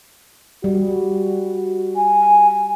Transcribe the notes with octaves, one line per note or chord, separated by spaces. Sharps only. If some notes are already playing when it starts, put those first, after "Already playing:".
G3 F#4
G#5